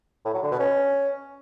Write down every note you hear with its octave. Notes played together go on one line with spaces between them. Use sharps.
A2
F#3
D3
B2
C#4